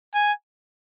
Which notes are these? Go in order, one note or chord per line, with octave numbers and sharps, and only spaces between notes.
G#5